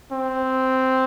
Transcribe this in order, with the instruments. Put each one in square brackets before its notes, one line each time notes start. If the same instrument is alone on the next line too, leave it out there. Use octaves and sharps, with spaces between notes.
[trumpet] C4